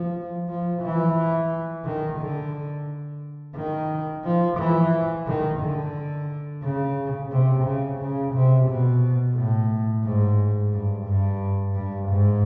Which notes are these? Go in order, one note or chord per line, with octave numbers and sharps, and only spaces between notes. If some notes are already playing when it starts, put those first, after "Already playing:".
Already playing: F3
F3
E3
D#3
D3
D#3
F3
E3
D#3
D3
C#3
C3
C#3
C#3
C3
B2
A2
G#2
G2
G2
G2
G#2